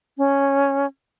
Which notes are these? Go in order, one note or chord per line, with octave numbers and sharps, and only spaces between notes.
C#4